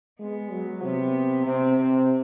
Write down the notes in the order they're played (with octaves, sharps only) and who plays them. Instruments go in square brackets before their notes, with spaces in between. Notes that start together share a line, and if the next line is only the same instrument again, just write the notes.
[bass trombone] G#3 [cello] B3
[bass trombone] F#3
[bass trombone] C3 [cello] B3
[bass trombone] C3 [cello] C4
[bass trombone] C3